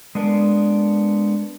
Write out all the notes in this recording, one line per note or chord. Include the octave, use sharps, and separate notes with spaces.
G#3 B3 D4 A#4